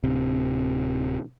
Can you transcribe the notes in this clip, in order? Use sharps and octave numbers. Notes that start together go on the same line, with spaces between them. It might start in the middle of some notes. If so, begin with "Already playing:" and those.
D1 C3